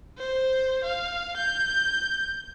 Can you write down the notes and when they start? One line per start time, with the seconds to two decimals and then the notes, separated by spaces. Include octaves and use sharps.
0.18 C5
0.84 F5
1.37 G6